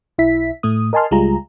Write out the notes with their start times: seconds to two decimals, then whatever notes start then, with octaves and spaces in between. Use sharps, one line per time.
0.18 B1 E4 E5 B6
0.63 A2 A3 D#6
0.93 A#4 D#5 G#5 A5 C6 F6
1.11 C#2 G3 G#3 F4 G#4 A#5